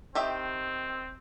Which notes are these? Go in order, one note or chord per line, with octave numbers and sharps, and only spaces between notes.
D#3 C4 G4 E5